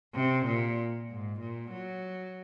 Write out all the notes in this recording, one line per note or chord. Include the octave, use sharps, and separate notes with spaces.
C3
A#2
G#2
A#2
F#3